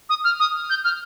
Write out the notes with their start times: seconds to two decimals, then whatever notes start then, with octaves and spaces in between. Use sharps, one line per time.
0.09 D#6
0.24 F6
0.39 D#6
0.69 G6
0.84 F6